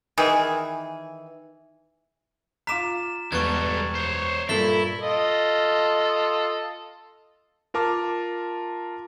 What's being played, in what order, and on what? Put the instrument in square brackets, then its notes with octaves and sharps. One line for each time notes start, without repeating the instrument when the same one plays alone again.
[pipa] D#3 E3 G#4
[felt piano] F4 D6 B6 [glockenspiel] A#5 E7
[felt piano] E1 B3 F#6 [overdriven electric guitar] G3 A4 [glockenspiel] C#6 G#6
[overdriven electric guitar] C5 C#5
[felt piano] G2 A#2 [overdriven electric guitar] E4 [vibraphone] A4 [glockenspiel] B6 G7
[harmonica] F4 A4 D#5
[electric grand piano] F4 A#4 A5 D6 F6